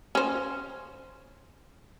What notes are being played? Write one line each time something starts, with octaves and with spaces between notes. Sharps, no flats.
C#4 C5